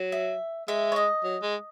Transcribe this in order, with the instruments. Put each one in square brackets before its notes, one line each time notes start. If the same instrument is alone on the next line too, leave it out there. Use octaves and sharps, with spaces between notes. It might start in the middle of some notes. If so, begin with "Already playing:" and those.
Already playing: [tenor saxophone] F#3
[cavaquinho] E5
[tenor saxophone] G#3 [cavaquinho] E5
[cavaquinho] C#5
D#5
[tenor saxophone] F#3
G#3